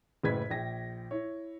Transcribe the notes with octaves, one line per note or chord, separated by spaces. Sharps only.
F#1 A2 B4 G#6 B6
A#1 G5 A#6
E4 C#5